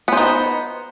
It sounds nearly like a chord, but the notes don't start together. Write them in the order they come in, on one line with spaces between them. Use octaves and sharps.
B3 C5 D#4